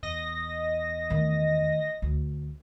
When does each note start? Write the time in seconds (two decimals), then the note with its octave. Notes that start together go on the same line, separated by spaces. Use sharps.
0.03 E2 D#5 A#6
1.10 D#3 A3
2.02 D2